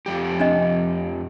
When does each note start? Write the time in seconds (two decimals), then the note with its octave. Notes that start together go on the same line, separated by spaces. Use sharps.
0.06 F2 F3 G4
0.40 D4 D#5